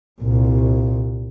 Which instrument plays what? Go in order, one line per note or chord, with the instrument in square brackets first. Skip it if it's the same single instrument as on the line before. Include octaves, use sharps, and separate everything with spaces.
[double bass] C2 A#2